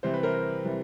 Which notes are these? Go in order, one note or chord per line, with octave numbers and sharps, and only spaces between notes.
C3 E3 G3 C5
B4
A#4 C5
C3 E3 G3